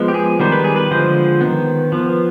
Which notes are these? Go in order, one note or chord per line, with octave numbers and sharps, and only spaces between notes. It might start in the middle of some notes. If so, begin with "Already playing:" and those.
Already playing: F3 G#3 B3
G4
G#4
D#3 G3 B3 C5
B4
G#4
B4
D3 F3 G#3 C5
D#3 B3
F3 B3